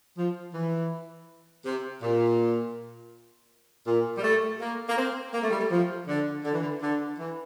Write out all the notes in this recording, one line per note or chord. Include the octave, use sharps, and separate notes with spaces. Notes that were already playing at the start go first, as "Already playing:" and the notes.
F3
E3
C3
A#2
A#2
G3
A3
A#3
A#3
C4
A#3
A3
G3
A3
F3
D3
D3
E3
D3
D3
E3